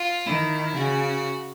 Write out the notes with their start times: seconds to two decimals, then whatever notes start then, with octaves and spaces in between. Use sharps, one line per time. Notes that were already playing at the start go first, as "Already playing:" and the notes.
Already playing: F4
0.27 D#3 E4
0.76 C#3 F#4